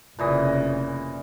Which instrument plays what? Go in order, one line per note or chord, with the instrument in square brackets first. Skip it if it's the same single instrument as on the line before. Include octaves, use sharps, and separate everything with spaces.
[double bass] F1 C#3 [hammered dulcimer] A#2 E3 D#5